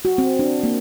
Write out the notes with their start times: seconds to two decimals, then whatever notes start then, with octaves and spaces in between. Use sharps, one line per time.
0.05 F#4
0.18 C4
0.39 D4
0.63 A#3